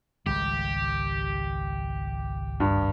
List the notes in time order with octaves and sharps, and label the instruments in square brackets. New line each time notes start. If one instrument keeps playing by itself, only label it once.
[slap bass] G#1 C#2 G3 [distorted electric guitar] G4
[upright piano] G2